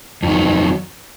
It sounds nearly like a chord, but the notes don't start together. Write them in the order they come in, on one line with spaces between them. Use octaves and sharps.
F2 D#3 F#3